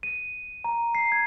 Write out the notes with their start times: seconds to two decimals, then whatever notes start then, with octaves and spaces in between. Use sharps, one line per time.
0.03 D#7
0.64 A#5
0.95 C7
1.12 G#6